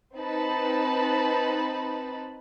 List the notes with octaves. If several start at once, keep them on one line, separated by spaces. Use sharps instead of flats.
C4 D#4 B4 A5 B5